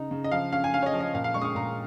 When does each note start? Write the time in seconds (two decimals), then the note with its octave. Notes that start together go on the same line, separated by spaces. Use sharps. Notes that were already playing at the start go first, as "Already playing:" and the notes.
Already playing: C#3 D#4 A#5
0.11 C#3
0.24 D#5
0.32 F3 F5
0.52 C#4 F5
0.64 G#5
0.74 C#4 F5
0.83 C#5
0.86 D#5
0.94 F3
1.00 D#5
1.14 A#2 F5
1.24 F5
1.34 G#3 C#6
1.41 D#6
1.45 C#6
1.55 A#2 A#5